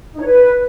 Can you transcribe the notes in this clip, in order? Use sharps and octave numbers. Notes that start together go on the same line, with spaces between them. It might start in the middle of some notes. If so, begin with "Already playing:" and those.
D#4
C#5
B4